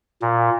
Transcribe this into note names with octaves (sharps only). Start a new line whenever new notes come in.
A#2